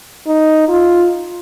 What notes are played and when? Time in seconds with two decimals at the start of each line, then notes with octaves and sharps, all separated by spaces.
0.27 D#4
0.69 F4